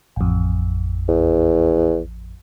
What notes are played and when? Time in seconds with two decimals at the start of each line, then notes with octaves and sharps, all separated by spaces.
0.16 A1 F2
1.08 E2